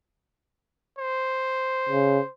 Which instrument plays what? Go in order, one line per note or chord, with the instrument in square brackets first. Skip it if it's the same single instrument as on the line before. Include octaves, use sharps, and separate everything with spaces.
[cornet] C5
[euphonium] C#3